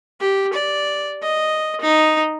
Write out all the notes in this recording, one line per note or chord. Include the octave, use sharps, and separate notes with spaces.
G4
D5
D#5
D#4